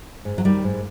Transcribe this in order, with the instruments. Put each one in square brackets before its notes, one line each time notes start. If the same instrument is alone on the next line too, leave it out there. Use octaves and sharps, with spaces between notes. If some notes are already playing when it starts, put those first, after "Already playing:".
[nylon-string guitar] G#2
F#3
D#3 G3
G#2